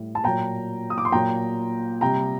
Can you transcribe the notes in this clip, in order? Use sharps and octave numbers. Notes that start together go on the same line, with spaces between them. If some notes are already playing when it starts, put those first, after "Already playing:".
Already playing: A2 G3
A5
A#2 F#3 G5 A#5
D#6
D6
C6
A#2 F#3 G5 A#5
C3 G3 G5 A#5